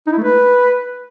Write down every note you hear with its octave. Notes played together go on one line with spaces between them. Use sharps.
D#4
E4
A3
B4